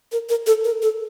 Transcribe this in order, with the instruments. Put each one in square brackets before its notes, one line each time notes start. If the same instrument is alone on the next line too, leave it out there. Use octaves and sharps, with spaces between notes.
[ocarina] A#4
A#4
A4
A#4
A4